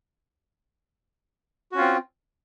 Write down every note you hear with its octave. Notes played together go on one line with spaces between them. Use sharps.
C4 C#4 F4 F#4